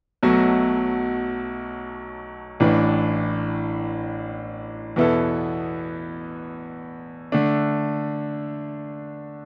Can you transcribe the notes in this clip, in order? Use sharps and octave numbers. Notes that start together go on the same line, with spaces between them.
B1 B2 F#3 A3 F#4
A1 A2 E3 D4
E2 B2 B3 E4 A4
D3 A3 D4